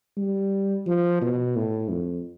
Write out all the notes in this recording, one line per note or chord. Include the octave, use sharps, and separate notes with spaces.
G3
F3
B2
A2
F2